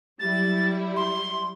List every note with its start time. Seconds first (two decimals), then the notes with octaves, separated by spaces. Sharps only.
0.19 F#3 G3 E4 A6
0.96 C6